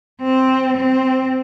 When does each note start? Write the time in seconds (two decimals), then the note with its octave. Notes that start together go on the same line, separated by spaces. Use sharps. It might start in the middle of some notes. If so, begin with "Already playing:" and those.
0.22 C4
0.77 C4